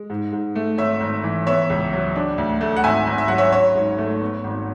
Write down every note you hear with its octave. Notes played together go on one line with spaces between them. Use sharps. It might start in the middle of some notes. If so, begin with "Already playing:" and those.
Already playing: G#3
G#2
G#2
A3
G#1 C#5 E5
G#1
E3
B3 C#5 E5
C#2
F#3
D4
D2
A3
F#5
G#1 E5 G#5
G#1
E5
F#3 F#5
C#5 E5
C#4 C#5
G#2
A3
B3
G#1